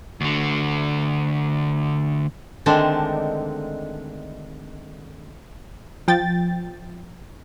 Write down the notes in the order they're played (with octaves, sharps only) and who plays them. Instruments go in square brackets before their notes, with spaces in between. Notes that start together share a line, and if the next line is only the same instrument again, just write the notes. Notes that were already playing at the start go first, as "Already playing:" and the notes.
[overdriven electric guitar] D2 D3
[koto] D3 D#3 G#3 A3 C4 D4
[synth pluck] F3 G5 A6